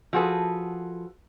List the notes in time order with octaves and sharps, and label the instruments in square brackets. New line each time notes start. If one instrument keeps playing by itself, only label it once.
[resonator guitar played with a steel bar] F3 F#4 G#4 A4 B4